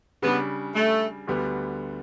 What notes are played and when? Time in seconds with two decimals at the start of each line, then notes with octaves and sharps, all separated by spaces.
0.22 C#3 G3 B3 D4
0.75 A3
1.28 D2 D3 G3 B3